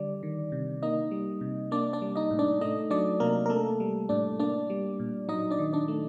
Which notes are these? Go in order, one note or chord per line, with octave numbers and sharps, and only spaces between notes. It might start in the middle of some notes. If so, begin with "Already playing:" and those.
Already playing: D3 G3 D4 D5
D#3
C3
A#3 D#4 D#5
G3
C3
A#3 D4 D5
D4 D5
G3
D#4 D#5
A2
D4 D5
A3 D#4 D#5
F#3 D4 D5
C3 A#3 A#4
A#4
A3 A#3 A4
G3
A2 D4 D5
A#3 D4 D5
G3
A#2
F#3 D#4 D#5
D4 D5
D#3
D4 D5
A3